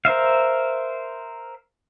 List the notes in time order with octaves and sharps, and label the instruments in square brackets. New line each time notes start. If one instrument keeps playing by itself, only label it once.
[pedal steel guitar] A#4 C5 E5 F5